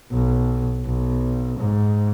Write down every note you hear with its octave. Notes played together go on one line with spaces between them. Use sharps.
B1
B1
G#2